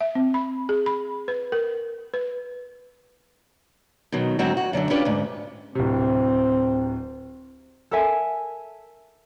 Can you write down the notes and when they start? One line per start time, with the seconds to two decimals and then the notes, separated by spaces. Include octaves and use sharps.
0.01 E5
0.15 C4
0.34 B5
0.69 G#4
0.86 B5
1.28 B4
1.52 A#4
2.14 B4
4.12 B2 D#3 F#3
4.39 G#2 D3 F#3 C4 D#4 F#4
4.57 F#4
4.73 F#2 D3 F3 F#3
4.90 C#4 D4 F4 G4 B4
5.05 D2 G#2
5.75 D1 C3 C4
7.91 A4 A#4 E5 G#5